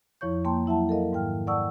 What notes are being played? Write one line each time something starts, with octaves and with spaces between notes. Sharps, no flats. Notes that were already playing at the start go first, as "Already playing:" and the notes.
F2 F3 E4 C#5 C#6 G6
A#3 G5 A5 C6
F#3 E4 E5 F#5 A5
A4 A#4 D#5 F5
G#2 D#3 G5 F6
D5 F#5 A5 C#6 D#6 E6